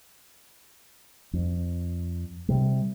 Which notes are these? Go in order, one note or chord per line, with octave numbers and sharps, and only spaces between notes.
F2
C3 G3